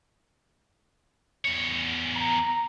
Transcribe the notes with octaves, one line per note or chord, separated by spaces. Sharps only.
E2 C#5
A#5